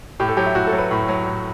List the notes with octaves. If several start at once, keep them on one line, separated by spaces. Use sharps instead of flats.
A2 G4
A4
F#3 G4
E4
A2 F#4
A4
F#3
B4
A2
F#3
A2